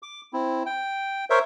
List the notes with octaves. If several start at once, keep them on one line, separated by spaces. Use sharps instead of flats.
D6
C4 E4
G5
A#4 C5 C#5 E5